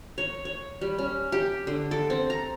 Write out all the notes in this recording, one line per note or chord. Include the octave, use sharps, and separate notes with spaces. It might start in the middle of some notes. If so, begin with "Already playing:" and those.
C#5
C#5
G3
C#4
G4
D3
A4
C4
A#5